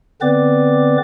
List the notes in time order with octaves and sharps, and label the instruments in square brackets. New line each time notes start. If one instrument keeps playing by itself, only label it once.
[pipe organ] D3 B3 C4 B4 D5 D6